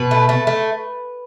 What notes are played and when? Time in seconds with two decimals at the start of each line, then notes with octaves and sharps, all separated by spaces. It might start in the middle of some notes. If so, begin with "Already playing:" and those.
Already playing: B2 B4
0.11 A3
0.29 A3
0.47 A3